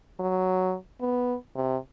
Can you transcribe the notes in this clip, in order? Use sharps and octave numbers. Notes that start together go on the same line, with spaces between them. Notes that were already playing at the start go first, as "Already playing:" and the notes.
F#3
B3
C3